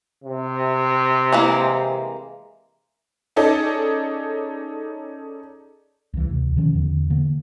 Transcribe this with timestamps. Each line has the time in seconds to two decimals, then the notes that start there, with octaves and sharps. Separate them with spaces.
0.24 C3
1.33 E3 G#3 A#3
3.36 C#4 D#4 G#4 A4 D5 D#5
6.14 C2 E3
6.29 D2 C3
6.56 B2 D#3 F3 C#4
6.74 E2 D3
7.10 D3 E3 A#3